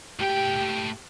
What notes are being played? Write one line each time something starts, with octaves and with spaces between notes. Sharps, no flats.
A2 G4 G5